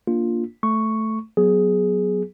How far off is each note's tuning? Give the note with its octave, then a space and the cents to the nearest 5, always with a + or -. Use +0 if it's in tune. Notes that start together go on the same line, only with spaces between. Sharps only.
A#3 +0 D4 +0 F4 +0
A3 -5 C#6 +0
F#3 +0 B3 +0 G#4 +5